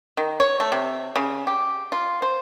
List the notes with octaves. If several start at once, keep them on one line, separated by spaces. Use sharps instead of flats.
D#3
C#5
A3
C3
C#3
G4
F4
C5